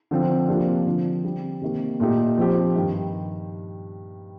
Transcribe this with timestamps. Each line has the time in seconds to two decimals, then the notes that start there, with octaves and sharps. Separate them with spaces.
0.11 D3 F3 C4 F4
0.48 C3 F3 A#3 D4 F4
0.86 D3 F3 C4
1.23 D3 G3 C4 G4
1.61 C3 D#3 A#3
2.00 A#2 A3 D#4 G4
2.38 F3 C4 G4
2.76 G2 D#3 G3